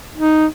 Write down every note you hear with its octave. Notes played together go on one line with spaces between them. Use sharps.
D#4